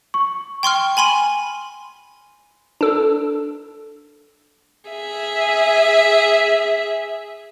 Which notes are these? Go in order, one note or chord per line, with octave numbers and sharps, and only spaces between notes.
C#6
G5 C6 C#6 F6
G#5 B5 C6 D#7
D4 A4
G#4 E5